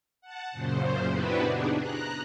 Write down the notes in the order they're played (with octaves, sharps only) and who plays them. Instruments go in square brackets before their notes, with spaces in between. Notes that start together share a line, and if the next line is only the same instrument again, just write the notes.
[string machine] F#5 A5
F#2 A#2 C#3 C5
B3 D4 E4 F#4 G4 B4
D4 D#4 G#4
A#5 F#6